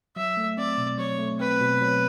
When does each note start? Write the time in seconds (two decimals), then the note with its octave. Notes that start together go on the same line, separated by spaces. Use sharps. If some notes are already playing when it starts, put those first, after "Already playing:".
0.16 F#3 E5
0.37 A3
0.57 C4 D5
0.78 B2
0.98 F#3 C#5
1.19 A3
1.39 C4 B4
1.61 B2
1.81 F#3